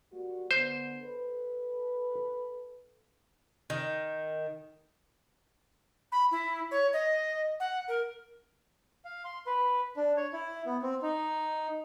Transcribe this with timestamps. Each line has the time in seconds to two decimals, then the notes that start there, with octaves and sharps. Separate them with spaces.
0.12 G3 A#3 F#4
0.51 D3 B3 C5
1.02 A4 B4
3.70 D#3
6.12 B5
6.31 E4
6.71 C#5
6.93 D#5
7.60 F#5
7.88 A#4
9.05 F5
9.25 C6
9.47 B4
9.97 D4
10.17 C#5
10.33 E4
10.66 B3
10.82 C4
11.02 D#4